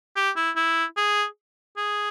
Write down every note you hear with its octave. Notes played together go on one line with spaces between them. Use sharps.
G4
E4
E4
G#4
G#4